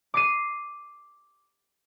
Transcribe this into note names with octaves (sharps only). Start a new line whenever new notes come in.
D6 C7 D#7